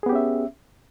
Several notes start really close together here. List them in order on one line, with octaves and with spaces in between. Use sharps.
G#4 B3 G4 C#4 E5